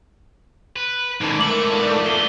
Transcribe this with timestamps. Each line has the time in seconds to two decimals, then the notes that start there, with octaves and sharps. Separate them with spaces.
0.76 B4
1.21 G#2 D#3 E3 A4
1.40 A3 A#4 D6 F#7
1.70 B3 D4 F4
2.06 E2 G7